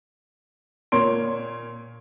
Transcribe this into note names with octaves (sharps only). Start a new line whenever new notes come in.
A#2 A#3 C#5 C6 D7